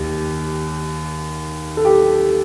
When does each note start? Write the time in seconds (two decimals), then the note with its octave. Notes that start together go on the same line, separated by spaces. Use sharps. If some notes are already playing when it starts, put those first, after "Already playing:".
Already playing: D#2 D#3 G4
1.77 A4
1.85 G4